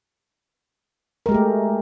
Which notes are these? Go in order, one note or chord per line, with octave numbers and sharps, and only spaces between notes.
G#3 A3 G4 A#4